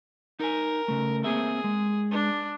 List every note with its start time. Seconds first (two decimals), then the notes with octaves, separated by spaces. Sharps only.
0.40 D#4 A#4 G#5
0.88 C#3 A3
1.24 A#3 C4 G#4 E5
1.64 G#3
2.11 D4